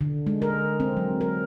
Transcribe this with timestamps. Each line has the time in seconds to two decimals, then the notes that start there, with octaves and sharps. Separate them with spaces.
0.01 D3
0.27 G#3
0.42 A#4
0.80 C4
0.97 F#3
1.21 A#4